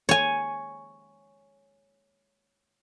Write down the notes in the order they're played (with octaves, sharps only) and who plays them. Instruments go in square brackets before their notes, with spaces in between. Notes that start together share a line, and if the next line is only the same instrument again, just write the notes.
[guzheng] C#5 G#5